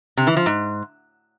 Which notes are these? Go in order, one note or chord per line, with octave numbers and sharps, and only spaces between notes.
C3
E3
F3
G#2